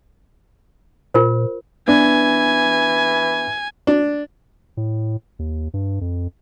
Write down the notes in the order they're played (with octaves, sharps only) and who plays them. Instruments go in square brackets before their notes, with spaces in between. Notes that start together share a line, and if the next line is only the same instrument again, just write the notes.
[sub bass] A#2 [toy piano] F4 A#4 C5
[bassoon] E3 [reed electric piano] B3 D4 [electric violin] G#5
[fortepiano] D4
[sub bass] A2
D#2
G2
F2